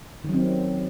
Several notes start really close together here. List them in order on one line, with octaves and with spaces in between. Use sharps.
D#3 F#3 C4